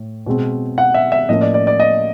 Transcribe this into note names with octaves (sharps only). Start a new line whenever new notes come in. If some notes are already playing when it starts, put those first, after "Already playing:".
Already playing: A2
B2 G#3 C4
F#5
E5
E5
A2 F3 A#3 C#4 D#5
D5
D5
D5
D#5